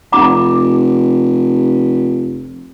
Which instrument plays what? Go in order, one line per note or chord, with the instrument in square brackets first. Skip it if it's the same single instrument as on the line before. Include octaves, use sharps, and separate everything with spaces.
[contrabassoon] F1 [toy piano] F#5 A#5 D6